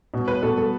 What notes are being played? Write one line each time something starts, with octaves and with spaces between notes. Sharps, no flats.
B2
B4
B2 A4
A4